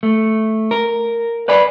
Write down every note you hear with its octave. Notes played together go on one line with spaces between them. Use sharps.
A3
A#4
B4 D5 G#5 B5